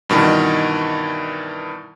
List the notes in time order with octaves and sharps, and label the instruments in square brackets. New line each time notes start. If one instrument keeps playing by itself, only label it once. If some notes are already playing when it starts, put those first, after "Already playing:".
[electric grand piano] G2 B2 D#3 E3